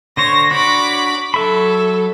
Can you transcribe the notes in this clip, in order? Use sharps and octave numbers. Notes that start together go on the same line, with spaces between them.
D3 C5 C#5 A#6
D4 F#4 C#5 B5 D6
F#3 A4 E5 B5